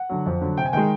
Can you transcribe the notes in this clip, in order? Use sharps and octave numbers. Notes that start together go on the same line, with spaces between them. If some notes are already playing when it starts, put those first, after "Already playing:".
Already playing: F#5
D3 F#3
F2
D3 F#3
C3 G5
G#5
D#3 G#3 G5